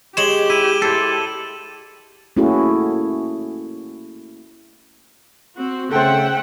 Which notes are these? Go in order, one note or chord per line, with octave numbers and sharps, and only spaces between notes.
G#3 G4 C#5 E7 F#7 G7
E4 D#7
E4 A4 C5
A3 A#3 C#4 E4 F#4 G#4
C4 F#4
C#3 A3 A4 C5 E5 F#5 G5